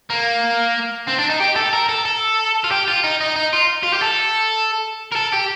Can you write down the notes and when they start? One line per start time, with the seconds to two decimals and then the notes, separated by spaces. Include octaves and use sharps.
0.10 A#3
1.08 C4
1.19 D4
1.30 D#4
1.40 G4
1.56 A4
1.73 A#4
1.89 A4
2.05 A4
2.64 F4
2.71 G4
2.88 F4
3.04 D#4
3.21 D#4
3.36 D#4
3.53 F4
3.83 F4
3.93 G4
4.02 A4
5.12 A#4
5.16 A4
5.33 G4